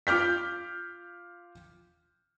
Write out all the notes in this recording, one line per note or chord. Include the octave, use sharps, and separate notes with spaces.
F4 D6 F6 G6 B6